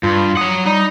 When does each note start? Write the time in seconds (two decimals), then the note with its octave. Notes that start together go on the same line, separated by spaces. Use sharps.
0.03 G2 F4
0.37 F#3 F#5 D#6
0.65 G3 D#4